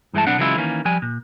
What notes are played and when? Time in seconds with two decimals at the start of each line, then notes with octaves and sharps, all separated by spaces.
0.14 G2 E3 G#3 E5 A5
0.27 B1 B3 C4 D4 F#5
0.38 C#3 E3 F#3 G#3 E4 F4
0.57 D#3 E3 A#3 C#4
0.85 F3 G3 G#5
1.02 A#2